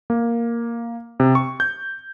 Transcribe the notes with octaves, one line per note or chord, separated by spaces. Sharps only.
A#3
C3
C#6
G6